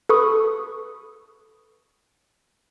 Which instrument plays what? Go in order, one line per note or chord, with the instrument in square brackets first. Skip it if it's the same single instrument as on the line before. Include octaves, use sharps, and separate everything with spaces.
[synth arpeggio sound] A4 B4 B5 C#6 D#6